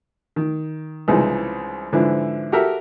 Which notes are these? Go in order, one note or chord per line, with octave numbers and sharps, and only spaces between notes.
D#3
C2 C#3 E3 F3 G#3 D#4
G#2 D3 E3 F3 E4
F#4 G4 A4 A#4 E5 G5